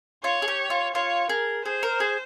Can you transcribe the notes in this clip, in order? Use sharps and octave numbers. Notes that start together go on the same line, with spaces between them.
F4 C#5
G#4
G4
F4
F4 C#5
G#4 A#4
G#4 C5
A#4
G#4